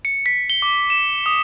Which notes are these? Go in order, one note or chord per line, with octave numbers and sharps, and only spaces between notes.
C#7
B6
G7
D6
E7
D#6